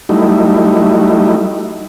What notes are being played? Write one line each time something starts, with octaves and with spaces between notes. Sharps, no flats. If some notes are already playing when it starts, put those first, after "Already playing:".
F#3 G3 A3 D#4 E4